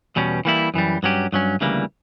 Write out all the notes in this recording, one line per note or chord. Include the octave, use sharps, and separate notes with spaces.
E2 B2 G3 C#4
E3 G3 A#3 E4
F#2 E3 G3
G2 F#3 C#4 G4
G2 F#3 C#4
D2 C#3 E3 G3 A#3